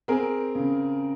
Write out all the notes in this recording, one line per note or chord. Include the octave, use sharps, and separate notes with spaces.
C4 G#4 A#4
C#3